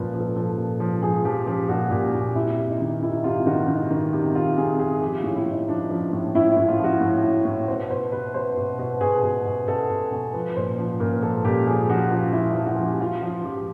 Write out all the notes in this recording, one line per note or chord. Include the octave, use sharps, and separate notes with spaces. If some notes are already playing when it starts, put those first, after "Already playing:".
Already playing: A#2 F3 B4
F3
A4
F3 A4
A#2
F3
F3 G#4
F3 G4
F3 G4
A#2 F#4
A#2 G4
A#2 G4
C3 E4
C3
D#4
D#3
C3 E4
C3 F4
D#3 F#4
D#3
D#3
C3
C3 F4
C3 G#4
C3 G#4
F3 G4
F4
A2
E4
A2
D#4
F3 D4
F3
A2
A2 E4
A2 E4
F4
F3 F#4
A2
A2
A2
B2 C5
B2 C5
B2 B4
B2 C5
B2
B2
B2 G#4
B2
B2
B2 A4
B2
B2
F3 B4
A#2 C5
F3
A#2 A#4
F3 A4
A#2 G4
F3 G#4
F3 F#4
F3 F4
F3 E4
F3 F4
F#4
F3
G4
F3 F4
F3 F4
F3 G4